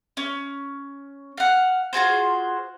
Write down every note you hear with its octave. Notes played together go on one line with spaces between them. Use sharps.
C#4
F5 F#5
F4 F#4 G#4 C5